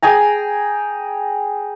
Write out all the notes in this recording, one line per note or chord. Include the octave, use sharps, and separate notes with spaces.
G#4 G5 G#5 A#5